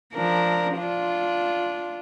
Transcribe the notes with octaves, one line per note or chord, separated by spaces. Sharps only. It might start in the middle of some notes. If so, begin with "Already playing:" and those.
F3 D4 A#4
D4 F4